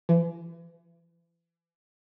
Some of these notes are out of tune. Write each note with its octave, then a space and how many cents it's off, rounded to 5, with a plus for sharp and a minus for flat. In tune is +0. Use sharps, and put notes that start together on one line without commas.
E3 +40